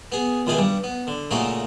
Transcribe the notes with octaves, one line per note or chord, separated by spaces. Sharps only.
B3 G#4
C#2 B2 D#3 E3 G#4 B4
G2 G3
B3
D3
A#2 C#3 A3 A#3 D#4 F#4